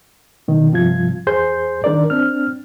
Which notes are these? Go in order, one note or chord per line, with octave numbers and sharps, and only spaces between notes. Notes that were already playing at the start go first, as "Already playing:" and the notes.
B2 D#3
G2 C3 F3 F4 G#6
E2 G#4 C5 C6 G6
D#3 D4 A#4 D5
C4 D4 F6